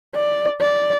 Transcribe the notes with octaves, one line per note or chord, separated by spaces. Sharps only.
D5
D5